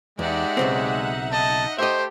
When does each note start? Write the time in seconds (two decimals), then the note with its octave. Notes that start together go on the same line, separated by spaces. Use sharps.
0.19 E2 G#3 D#4 G4 D5 E5 F#5
0.57 B1 C#3 C4
1.32 D#5 A5
1.78 A3 G4 C5 D#5 E5